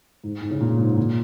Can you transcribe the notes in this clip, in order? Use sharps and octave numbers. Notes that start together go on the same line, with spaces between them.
G#2
G#2
C#3
A#2
G#2
A#2